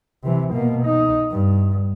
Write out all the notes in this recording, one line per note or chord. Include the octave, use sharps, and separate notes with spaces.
C3 E3
B2 A#3
D#4
G2